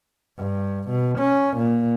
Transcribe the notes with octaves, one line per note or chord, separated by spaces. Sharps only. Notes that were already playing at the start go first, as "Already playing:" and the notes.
G2
B2
C#4
A#2